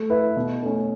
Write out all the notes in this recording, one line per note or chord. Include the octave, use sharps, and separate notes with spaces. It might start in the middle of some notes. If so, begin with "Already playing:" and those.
Already playing: A3
E4 B4 E5
B2
A3 C#4